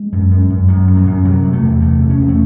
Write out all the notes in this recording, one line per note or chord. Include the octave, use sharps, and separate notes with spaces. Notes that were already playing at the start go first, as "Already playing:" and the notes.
Already playing: G#3
F#2
F#2
F#2
F#2 F#3
F#2
F#3
F#2
C3 F#3
C3
A3
E2
C3 A3
C3
C#4
E2
A3